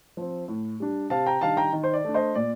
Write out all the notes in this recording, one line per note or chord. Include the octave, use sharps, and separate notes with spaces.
F3 C4
A2
G3 D4
C3 F5 A5
G5 A#5
D#3 G3 D4 F5 A5
G5 A#5
D#3
C5
D5
A3 D4
C5 D#5
A#2 D5